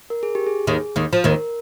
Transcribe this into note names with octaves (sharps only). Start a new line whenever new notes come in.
A#4
G#4
G4
G#4
D#2 D#3
D#2 D#3
F3
D#2 D#3 A#4